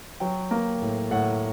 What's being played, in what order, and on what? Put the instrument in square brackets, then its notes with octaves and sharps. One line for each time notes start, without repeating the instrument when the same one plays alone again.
[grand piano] F#3 G5
A#3
A2
A2 F#5